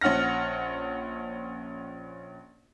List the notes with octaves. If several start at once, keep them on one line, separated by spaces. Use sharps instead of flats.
A#1 C#4 F#5 F6 A#6